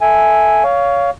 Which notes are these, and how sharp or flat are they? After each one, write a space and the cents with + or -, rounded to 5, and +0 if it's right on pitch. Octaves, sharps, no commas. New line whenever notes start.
A4 +0 E5 -5 G#5 +0
C#5 +20 F5 +0